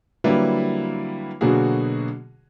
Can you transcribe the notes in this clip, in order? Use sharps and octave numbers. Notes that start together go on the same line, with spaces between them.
D3 F#3 G3 A#3 E4 B4
B2 D3 F#3 A#3 F#4 G#4